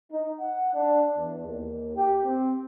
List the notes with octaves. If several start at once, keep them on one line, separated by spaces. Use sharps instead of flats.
D#4
F#5
D4
E2
D#2
G4
C4